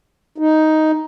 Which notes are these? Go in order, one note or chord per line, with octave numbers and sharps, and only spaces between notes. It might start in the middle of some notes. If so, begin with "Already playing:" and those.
D#4